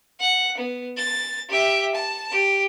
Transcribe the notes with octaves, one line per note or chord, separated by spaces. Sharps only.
F#5
B3
A6
G4 E5
A5
G4